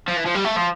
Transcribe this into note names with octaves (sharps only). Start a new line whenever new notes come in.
F3
E3
F3
G3
A3
F3